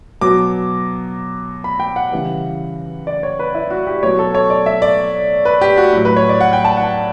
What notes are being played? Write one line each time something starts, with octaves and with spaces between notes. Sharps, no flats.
B2 F#3 D6
B5
G5
F#5
C#3 E3 G3
D5
C#5
B4
E4
F#4
G4
B2 F#3 C#5
A4
C#5
D5
E5
D5
B4
G4
F#4
A2 F#3
B4
C#5
D5
F#5
G5
A5
F#5